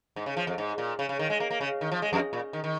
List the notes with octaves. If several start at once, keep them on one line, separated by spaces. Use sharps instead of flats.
G#2
C#3
F3
F2
G#2
A#2
C#3
C#3
D#3
G#3
A#3
A#3
C#3
D#3
F3
G#3
F2
A#2
D#3
D#3